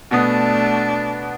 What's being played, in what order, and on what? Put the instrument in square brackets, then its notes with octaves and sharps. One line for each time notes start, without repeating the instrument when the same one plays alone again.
[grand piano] B2 B3 D#6 [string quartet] A3 [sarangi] D4